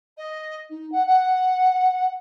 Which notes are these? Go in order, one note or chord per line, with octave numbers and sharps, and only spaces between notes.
D#5
D#4
F#5
F#5